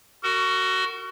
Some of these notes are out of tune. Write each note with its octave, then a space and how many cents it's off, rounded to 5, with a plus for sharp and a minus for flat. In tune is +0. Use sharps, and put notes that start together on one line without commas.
F#4 +15 A#4 -35